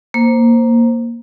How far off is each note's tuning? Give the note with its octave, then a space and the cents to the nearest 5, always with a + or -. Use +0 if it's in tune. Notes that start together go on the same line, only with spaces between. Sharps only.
A#3 +0 C5 +5